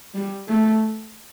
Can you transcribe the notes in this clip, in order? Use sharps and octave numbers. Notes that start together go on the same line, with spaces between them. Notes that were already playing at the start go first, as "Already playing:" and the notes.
G3
A3